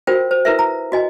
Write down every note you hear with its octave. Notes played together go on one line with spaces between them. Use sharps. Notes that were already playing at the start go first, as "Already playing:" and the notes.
F4 F#4 A#4 C5 G5
C5
E4 A#4 B4 E5
A#5
F#4 D#5 G#5